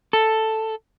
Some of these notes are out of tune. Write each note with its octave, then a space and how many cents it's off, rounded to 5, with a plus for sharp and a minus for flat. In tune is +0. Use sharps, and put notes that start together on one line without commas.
A4 +5